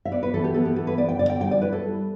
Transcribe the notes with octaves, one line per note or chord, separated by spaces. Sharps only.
E5
B3 D5
B4
E3 A4
G4
B3 A4
G4
E3 A4
B4
B3 D5
G5
D3 D5
G5
G3 G5
D5
E4 B4
A4
G3